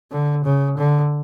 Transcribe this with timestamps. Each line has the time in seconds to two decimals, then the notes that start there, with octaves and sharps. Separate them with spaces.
0.12 D3
0.45 C#3
0.78 D3